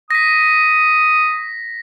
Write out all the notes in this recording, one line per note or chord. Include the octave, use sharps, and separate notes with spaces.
D#6 A#6 B6